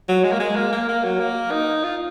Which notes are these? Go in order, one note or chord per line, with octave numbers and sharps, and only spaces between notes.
F#3
G#3
A#3
G#3
A#3
A#3
A#3
F#3
A#3
D#4
F4